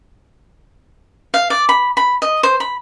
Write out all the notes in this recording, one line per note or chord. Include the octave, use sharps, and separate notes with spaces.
F5
D5
B5
B5
D#5
C5
B5